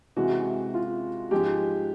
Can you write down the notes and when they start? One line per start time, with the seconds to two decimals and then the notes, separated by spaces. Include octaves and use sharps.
0.16 C3 E3 G#3 F#4
0.74 F4
1.31 G#2 F3 G#3 G4